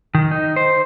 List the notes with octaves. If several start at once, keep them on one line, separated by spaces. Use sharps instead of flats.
D#3
D#4
C5